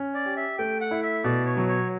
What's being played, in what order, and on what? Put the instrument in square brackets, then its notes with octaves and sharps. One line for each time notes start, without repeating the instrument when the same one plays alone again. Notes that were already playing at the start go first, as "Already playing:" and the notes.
Already playing: [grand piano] C#4
[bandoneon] D5
[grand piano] G4
[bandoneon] E5
[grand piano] A3 [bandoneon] G5
[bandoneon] F#5
[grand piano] E4
[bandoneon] E5
[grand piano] B2 [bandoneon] D5
[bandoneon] C#5
[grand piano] F#3
[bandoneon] C#5